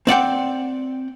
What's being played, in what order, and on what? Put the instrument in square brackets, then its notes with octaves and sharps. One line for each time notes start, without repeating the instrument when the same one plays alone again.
[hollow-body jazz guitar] C4 D5 F#5 G5